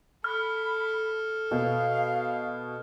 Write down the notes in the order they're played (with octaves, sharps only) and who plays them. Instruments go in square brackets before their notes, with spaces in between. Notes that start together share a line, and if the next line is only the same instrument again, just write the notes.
[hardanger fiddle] A4 [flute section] B5 [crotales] F6
[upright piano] B2 [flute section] F5